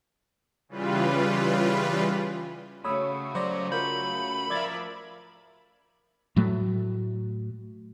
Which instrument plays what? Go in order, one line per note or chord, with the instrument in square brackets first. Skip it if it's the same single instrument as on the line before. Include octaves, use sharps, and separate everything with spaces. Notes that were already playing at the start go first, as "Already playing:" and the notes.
[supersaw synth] C#3 E3 G3 F4 B4
[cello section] C#3 A3 F#4 [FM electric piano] C#5 [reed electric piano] B5 D#6 E6
[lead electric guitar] F#3 [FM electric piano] C5 D5 A#6
[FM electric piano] F4 [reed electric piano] A#4 G6 [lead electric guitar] B5
[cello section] F3 A#4 E5 [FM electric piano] D5 G#6 A6
[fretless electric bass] A2 F#3 A3